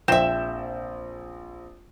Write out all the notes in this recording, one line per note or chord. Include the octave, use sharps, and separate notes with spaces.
A#1 C4 E5 G6 E7